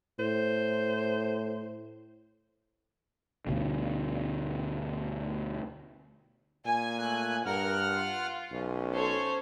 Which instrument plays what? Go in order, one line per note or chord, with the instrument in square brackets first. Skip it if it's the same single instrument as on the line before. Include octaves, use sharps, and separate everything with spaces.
[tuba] A2 [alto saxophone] C5
[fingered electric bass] D2 B2 D3
[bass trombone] A#2 [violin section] G#5
[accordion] A3 F#6
[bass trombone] G2 [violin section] A#4 [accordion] F#5 F6
[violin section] F4
[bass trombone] B1 [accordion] C#4
[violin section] A4 C5 C#5